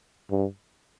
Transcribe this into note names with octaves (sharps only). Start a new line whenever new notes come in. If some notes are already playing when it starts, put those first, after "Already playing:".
G2